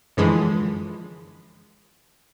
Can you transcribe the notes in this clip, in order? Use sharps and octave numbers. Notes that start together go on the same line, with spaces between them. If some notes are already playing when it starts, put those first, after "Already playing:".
F#2 D3 E3 F3 G#3